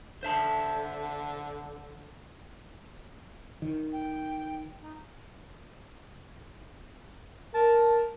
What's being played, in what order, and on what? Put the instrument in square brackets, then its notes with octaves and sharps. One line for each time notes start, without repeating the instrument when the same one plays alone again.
[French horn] D3 [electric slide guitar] C5 E5 A5
[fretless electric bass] D#3
[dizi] G5
D#4
[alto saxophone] A#4 [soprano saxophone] A5